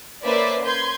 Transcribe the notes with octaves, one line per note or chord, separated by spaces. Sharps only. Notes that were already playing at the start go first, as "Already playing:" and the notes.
A#3 C#4 B4 C5 D5 E5
B4 C6 G6 G#6